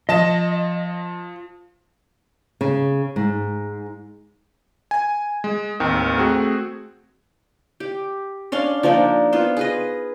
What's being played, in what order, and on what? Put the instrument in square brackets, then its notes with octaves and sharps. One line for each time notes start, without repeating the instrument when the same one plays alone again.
[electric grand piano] F3 A5 E7 [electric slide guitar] D#5
[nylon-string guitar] C#3
G#2
[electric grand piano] G#5
G#3
A1 D#2 D#3 C4
A3 C4 F#4 G#4
[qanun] G4
C#4 D4 F5 C6
F3 A#3 D4 D#4
B3 F4 C5
G#4 B4 D#5